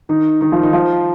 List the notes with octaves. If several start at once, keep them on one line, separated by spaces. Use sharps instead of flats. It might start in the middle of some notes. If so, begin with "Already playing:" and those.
D#3 D#4
D#3 D#4
F3 F4
D#3 D#4
F3 F4